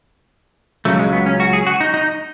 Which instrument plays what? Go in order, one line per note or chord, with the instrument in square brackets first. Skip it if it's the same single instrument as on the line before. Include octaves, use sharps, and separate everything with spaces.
[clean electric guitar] C#2 C#3 F#3 A3
G#3
B3
C#4
F#4
G#4
F#4
D#4
D#4